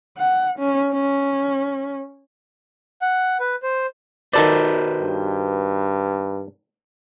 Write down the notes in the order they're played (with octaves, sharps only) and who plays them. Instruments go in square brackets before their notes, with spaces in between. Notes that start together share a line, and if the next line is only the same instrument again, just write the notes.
[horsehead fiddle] F#5
C#4
C#4
[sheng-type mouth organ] F#5
B4
C5
[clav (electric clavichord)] D#3 A4 D5 [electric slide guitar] F#4 B4 C5
[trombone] G2